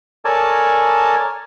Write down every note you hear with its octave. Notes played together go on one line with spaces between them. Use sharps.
A4 A#4 C#5 D5 G#5 A5